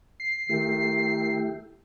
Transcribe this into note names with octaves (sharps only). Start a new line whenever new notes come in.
C7
D#3 A3 E4 G4